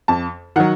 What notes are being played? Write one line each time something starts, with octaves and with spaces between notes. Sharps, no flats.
F2 A5
D#3 F#3 F#5